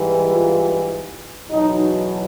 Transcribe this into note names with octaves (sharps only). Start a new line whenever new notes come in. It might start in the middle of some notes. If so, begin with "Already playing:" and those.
Already playing: G#2 E3 G3
F4
E2 B2 F#3 D#4